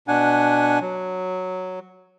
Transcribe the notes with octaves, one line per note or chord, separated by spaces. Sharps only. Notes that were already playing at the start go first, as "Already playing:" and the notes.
B2 D4 F#5 G#5
F#3